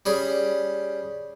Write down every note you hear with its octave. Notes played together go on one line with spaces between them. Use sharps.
G3 C#4 G#4